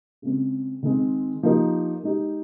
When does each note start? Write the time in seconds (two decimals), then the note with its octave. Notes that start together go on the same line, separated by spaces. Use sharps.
0.22 C#3 G#3 C4
0.83 D#3 G#3 C4
1.43 F3 A#3 D#4 G4 A#4
2.03 G#3 D#4 G4